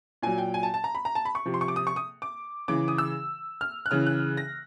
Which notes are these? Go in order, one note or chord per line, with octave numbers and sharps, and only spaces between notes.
A#2 F#3 G#5
G5
G#5
A5
A5
A#5
B5
A#5
A5
B5
C#6
C3 F3
C6
C#6
D6
D#6
C#6
D#6
D6
C#3 E3 D6
D#6
E6
F6
F#6
C#3 E3 F6
F#6
A#6